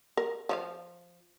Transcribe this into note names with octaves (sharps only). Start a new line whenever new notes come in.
A#4
F3 C#5 F5